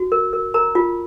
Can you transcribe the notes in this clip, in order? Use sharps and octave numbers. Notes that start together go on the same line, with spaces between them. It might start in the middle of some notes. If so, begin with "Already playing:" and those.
Already playing: F#4
A#4
A#4
A#4 A#5
F4